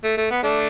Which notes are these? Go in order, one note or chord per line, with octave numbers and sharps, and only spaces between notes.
A3
A3
B3
A3 D4